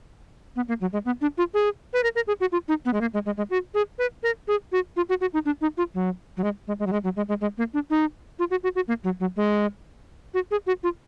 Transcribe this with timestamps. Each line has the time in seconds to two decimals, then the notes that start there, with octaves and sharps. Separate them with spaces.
0.56 B3
0.68 A#3
0.81 F#3
0.93 G#3
1.05 B3
1.21 D4
1.38 F4
1.54 G#4
1.93 B4
2.03 A#4
2.16 A#4
2.27 G#4
2.40 F#4
2.52 F4
2.68 D#4
2.85 B3
2.93 G#3
3.01 A#3
3.14 G#3
3.26 G#3
3.37 G#3
3.50 F#4
3.74 G#4
3.99 B4
4.23 A#4
4.48 G#4
4.72 F#4
4.96 F4
5.09 F#4
5.21 F#4
5.33 D#4
5.46 D4
5.61 D#4
5.77 F4
5.94 F#3
6.37 F#3
6.44 G#3
6.67 G#3
6.79 G#3
6.87 F#3
6.92 G#3
7.04 F#3
7.16 G#3
7.28 G#3
7.41 G#3
7.58 A#3
7.74 D4
7.90 D#4
8.39 F4
8.51 F#4
8.63 F#4
8.75 F#4
8.88 A#3
9.04 F#3
9.20 F#3
9.37 G#3
10.34 F#4
10.51 G#4
10.67 F#4
10.83 F4